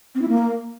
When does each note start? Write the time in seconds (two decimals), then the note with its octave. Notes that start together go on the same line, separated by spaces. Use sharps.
0.15 C4
0.22 E4
0.28 A#3